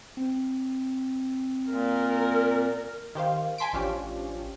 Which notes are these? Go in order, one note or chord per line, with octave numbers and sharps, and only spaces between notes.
C4
A#2 A#4
D#3 G4 C5 F5
G#5 A5 C6 B6 D7
A1 F3 C#4 D4 F4 G4